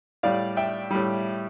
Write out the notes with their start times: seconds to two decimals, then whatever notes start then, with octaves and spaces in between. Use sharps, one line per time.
0.23 A2 G3 D5 F5
0.57 E5 G5
0.91 A2 G3